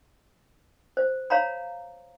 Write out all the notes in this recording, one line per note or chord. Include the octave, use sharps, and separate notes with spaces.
C5
C#5 F5 A#5 B5